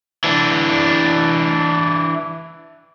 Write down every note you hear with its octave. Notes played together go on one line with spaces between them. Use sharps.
E3 D4